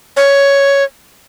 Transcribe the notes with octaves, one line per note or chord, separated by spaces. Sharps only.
C#5